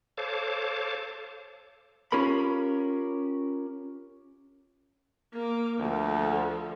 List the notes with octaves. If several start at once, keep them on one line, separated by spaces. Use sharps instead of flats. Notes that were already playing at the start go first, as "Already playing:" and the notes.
A4 C5 C#5 F5 A5 D6
C#4 F4 G4 A#4 B5
A#3 D6
D2 F3 A4